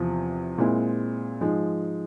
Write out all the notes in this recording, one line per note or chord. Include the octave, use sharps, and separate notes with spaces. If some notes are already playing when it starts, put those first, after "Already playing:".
Already playing: E2 C3 F3 C4
A#2 G#3 C4 E4
G#2 F3 G#3